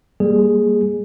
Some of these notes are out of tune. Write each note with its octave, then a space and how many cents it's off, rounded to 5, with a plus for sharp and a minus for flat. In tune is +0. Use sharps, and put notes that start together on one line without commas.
G3 +20 A#3 +0 G#4 +0